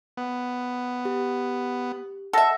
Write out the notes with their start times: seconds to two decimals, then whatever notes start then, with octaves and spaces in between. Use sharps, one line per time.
0.17 B3
1.05 G4
2.33 A4 E5 F#5 E6 A#6